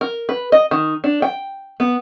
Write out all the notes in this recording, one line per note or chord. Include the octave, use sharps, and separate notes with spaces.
A#4
B4
D#5
D#3
D4
G5
B3